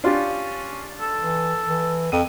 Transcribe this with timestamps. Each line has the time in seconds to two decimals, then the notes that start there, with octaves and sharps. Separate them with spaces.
0.04 C#4 D4 F4 G4
1.01 A4
1.19 E3
1.68 E3
2.12 F2 D#7